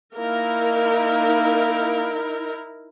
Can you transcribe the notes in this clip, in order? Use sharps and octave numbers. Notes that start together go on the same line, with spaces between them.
A#3 D#4 E4 A#4